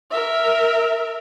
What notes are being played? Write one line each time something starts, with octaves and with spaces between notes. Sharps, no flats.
A#4 E5